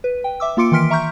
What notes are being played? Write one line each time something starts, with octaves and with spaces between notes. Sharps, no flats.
B4
G5
E5 D6 E6
A#3 F4 C6 D6 C#7 D7
D#3 E3 C6 F6 B6 D7
E5 A#5 C#6 F6 G6